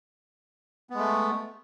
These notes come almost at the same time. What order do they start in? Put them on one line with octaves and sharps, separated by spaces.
B3 G#3 A3